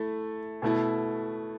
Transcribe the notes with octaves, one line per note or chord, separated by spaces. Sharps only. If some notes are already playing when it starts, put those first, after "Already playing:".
Already playing: A3 E4
B2 A3 E4